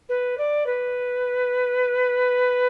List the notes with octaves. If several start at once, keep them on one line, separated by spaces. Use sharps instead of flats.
B4
D5
B4